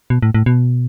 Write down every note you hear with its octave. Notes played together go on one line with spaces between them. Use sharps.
B2
A2
A2
B2